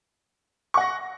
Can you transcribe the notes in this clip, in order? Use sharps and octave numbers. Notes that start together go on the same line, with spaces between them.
F#5 C#6 A#6